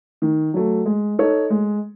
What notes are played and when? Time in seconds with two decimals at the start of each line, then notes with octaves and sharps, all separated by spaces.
0.22 D#3
0.54 F#3 A3
0.86 G#3
1.19 D#4 A4 C#5
1.50 G#3